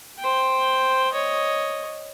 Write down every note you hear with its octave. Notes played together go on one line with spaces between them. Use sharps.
C5 G5
C#5 D#5